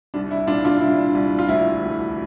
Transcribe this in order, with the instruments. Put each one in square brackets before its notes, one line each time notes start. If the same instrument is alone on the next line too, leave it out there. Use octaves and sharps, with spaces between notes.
[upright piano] C2 D4
E4
A#2 D4 F4
D4 F4
C2 E4
C2
F4
D2 E4
E1